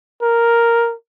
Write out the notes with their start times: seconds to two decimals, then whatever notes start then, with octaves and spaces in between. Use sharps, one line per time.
0.22 A#4